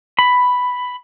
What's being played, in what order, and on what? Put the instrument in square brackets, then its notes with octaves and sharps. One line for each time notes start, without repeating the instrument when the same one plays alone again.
[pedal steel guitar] B5